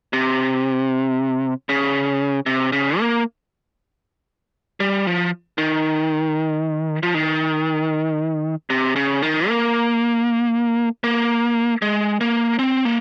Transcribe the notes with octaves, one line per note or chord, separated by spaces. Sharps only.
C3
C#3
C3
C#3
A#3
G3
F3
D#3
F3
D#3
C3
C#3
D#3
A#3
A#3
G#3
A#3
C4
A#3